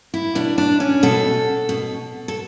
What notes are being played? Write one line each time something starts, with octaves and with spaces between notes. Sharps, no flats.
E4
B2 D4
D4
C#4
B2 A4
B2
A4